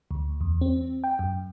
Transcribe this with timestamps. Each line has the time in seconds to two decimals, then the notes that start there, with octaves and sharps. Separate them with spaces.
0.11 D2
0.41 E2
0.61 C4
1.04 G5
1.19 F#2